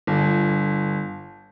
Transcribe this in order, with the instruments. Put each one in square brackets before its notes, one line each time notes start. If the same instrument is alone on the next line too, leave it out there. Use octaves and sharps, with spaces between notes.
[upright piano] G1